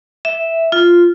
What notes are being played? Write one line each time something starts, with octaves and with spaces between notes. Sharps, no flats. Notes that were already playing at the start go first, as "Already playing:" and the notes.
E5
F4